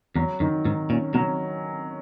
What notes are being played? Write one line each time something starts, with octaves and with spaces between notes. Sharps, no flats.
E2 F#3
F#2 D#3
G#2 D#3
A#2 C#4
B2 F#3